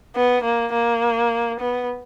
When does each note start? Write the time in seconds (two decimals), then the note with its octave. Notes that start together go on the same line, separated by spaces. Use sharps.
0.16 B3
0.44 A#3
0.74 A#3
1.60 B3